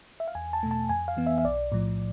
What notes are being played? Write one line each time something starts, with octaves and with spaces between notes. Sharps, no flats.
E5
F5
E2 G#5
A5
B2 A3
A5
F2 G#5
F5
E3 B3
E5
E5
B1 D5
A2 F3